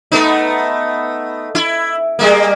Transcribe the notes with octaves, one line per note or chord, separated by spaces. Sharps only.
A3 B3 D#4
E4
G3 G#3 A#3